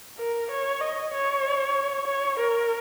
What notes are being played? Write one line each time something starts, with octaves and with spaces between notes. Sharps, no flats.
A#4
C#5
D#5
C#5
C#5
A#4